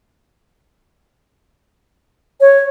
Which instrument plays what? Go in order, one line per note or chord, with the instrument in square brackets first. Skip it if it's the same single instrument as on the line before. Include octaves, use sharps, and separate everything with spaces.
[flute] C#5